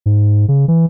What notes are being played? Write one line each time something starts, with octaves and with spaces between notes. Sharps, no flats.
G#2
C#3
E3